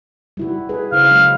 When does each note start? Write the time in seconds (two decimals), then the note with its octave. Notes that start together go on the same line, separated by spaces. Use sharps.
0.37 G3 E4 F#4
0.69 G#4 B4
0.92 C#3 E4 C5 F5
1.11 F#3 G#3 C#4